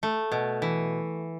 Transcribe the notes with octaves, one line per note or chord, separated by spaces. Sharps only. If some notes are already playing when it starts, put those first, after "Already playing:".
A3
B2
E3